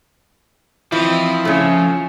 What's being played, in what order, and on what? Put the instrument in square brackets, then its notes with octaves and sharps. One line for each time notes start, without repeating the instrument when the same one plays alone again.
[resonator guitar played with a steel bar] E3 [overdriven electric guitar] F3 [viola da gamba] C4 D#5 [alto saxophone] E4
[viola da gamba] C#3 [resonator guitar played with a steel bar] A3 C#4